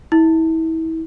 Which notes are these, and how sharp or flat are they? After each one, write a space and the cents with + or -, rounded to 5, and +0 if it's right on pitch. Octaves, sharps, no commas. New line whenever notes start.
E4 -35